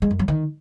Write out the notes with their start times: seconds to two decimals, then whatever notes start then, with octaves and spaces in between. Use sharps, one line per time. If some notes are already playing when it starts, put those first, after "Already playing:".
0.02 G#3
0.11 F#2
0.19 F#3
0.28 D#3